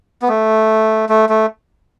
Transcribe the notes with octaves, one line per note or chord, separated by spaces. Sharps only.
B3
A3
A3
A3